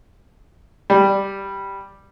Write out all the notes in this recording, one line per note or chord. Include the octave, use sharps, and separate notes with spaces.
G3